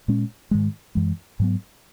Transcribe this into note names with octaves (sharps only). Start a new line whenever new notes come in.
A#2 G#3 C#4
G#2 D#3 G#3
F#2 E3 G#3
G#2 F#3 B3